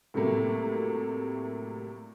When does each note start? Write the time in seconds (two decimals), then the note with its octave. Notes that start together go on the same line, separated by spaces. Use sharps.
0.14 A2 C3 F#3 G3 A3 A#3